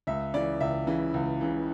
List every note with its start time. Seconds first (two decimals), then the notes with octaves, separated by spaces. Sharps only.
0.07 C#2 E5
0.34 C#3 E3 D5
0.60 C#2 E5
0.87 C#3 E3
1.14 C#2
1.41 C#3 E3